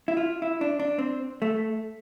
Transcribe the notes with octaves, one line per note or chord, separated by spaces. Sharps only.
E4
F4
E4
D4
D4
C4
A3